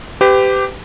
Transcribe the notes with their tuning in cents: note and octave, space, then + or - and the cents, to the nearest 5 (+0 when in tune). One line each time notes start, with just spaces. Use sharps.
G4 +0 B4 +40